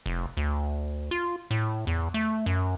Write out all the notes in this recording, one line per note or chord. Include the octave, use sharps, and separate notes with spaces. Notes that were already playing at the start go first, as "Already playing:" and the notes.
F1
D2
F4
A2
E2
A3
F#2